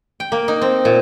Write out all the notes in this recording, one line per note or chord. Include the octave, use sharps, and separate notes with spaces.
G5
A#3
D#4
C4
A#2